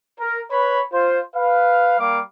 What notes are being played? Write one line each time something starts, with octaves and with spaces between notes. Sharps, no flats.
A#4
B4 C#5 B5
F4 C5
B4 F5
G3 A#3 F5 D6